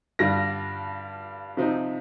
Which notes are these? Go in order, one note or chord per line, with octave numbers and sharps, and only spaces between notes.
G2 D3 G3 D4 F4 A#6
C3 F3 C4 D#4